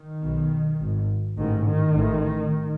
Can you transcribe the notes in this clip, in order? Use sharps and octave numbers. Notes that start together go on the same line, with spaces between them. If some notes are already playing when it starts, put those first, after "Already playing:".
Already playing: D#3
B1 B2
G#1 G#2
A1 G#2 D#3
D#3
A1 A2